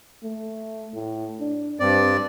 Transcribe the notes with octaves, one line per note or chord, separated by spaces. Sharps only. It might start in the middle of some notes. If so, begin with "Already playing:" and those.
A3
A2
D4
G2 C4 D5